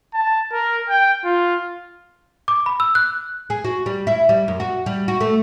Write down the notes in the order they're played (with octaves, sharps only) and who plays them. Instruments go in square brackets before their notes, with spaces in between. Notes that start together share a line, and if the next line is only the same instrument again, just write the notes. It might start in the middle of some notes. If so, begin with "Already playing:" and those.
[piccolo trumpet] A5
A#4
G5
F4
[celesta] D6
B5
E6
F#6
[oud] G#4
F#4
G3
E4
G3
F#2
F#4
G3
F#4
A3